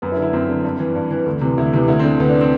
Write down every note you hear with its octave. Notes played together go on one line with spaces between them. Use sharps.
F#2 B3
E4
D3
E4
F#2 C4
D3
G2
E3
G2
E3
D2
C3 E3
D2 E4
C3 E3 G4
D2 E4
D3 C4
D2 B3
D4
D3
C4